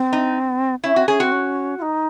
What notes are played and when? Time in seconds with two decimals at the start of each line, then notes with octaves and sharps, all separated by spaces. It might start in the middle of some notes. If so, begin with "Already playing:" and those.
Already playing: C4
0.13 D#4
0.84 C#4 E4
0.95 C4 F#4
1.07 C#4 G#4
1.19 C4 F#4
1.32 C#4
1.78 F4
1.82 D#4